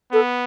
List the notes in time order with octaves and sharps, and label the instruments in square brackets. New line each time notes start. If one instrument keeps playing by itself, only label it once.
[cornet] B3 [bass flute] A4